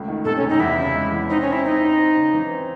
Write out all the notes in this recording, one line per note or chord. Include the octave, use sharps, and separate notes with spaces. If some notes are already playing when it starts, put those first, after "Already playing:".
Already playing: C#2 A3
D#3
C3 A4
C#4
C3
D#4
E2 E4
C#3
G#3
E2
C4 D#4
C#4
C4
E4
C4 D#4
C4
C4
C#3
E3
C4